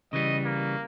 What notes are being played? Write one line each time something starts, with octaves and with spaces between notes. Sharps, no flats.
C#3 E3 G3 D#5
A#3